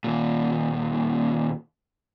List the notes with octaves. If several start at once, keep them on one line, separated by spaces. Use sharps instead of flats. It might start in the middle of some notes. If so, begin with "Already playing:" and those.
D#2 A#2